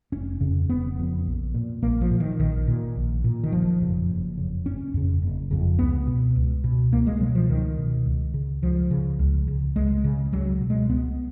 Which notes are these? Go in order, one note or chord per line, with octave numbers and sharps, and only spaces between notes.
F1 C#4
F2 C#3
F1 B3
F2 C#3
A#1
A#2
A#1 A#3
F3
A#2
D#3
A#1 D#3
A#2
A#1
A#2
D#3
F#1 F3
F2 C#3
F#1
F2 C#3
F#1 C#4
F2 C#3
F#1
F2 C#3
C#2 B3
B2
C#2
B2
C#2 A#3
G#3
B2 F#3
F3
C#2 D#3
B2
C#2
C#3
C#2 F3
C#3
C#2
C#3
C#2 G#3
C#3
C#2 F#3
B2
G#3
C#2 B3